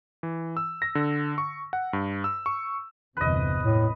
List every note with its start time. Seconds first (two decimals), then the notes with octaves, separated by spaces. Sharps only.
0.23 E3
0.57 E6
0.82 A#6
0.95 D3
1.38 C#6
1.73 F#5
1.93 G2
2.24 E6
2.46 C#6
3.17 G1 E2 C3 B4 D#5
3.63 A2